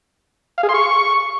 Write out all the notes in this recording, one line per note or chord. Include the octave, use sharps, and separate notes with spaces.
F5
G#4
C6
C#6